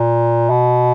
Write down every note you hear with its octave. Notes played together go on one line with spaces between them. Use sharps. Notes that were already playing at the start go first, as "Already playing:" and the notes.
Already playing: A#2
B2